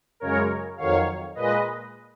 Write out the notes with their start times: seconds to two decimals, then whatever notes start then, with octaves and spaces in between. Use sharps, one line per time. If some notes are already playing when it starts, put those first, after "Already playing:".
0.20 F#2 C#3 G#3 A#4 C#5
0.77 F2 D#3 F#3 C#5 F5
1.35 A#2 G#3 B4 D#5